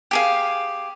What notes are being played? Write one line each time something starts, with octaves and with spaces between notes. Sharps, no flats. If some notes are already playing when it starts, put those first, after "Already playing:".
G4 G#4 F5